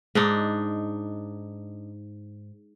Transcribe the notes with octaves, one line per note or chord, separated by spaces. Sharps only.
G#2 D4 D#4